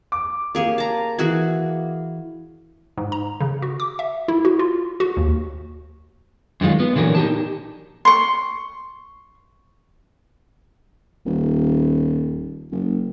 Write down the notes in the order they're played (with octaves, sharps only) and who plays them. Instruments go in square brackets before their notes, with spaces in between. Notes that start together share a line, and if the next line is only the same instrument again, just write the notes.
[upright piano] D6
[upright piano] A#3 [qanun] G4 G#4 C#5
[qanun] A5 A#5
E3 F#4 G#4
[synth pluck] G#2
A#5
C#3
F#4
D6
E5
E4
F#4
F4
F#4
D#2
[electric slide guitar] F#2 D#3 G#3 F4
B3
A#2 D3 E3 F#3 A#4
D#4 G4 A5
[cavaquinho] C6 C#6
[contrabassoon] D#1
F#1